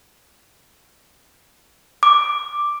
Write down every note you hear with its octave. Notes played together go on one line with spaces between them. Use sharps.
D6